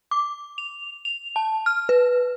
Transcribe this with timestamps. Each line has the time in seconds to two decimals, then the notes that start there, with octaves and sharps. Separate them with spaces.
0.11 D6
0.58 F7
1.05 F7
1.36 A5
1.66 F6
1.89 B4